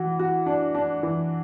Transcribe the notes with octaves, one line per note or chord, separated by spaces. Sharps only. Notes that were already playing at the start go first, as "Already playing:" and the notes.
Already playing: E3 F#4
F#4
D4
D4
E3